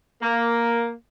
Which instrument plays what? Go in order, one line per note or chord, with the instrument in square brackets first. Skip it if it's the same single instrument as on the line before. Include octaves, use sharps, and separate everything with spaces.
[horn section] A#3